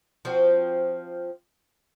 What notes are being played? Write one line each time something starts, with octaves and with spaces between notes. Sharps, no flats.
F3 C4 F#4